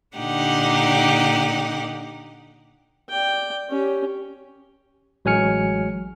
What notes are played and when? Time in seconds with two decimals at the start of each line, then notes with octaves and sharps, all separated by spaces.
0.17 A#2 D3 D#4 G4 F#5
3.09 D5 G5
3.70 C#4 G4
5.25 A1 F#3 G#3 G#5 F6 C#7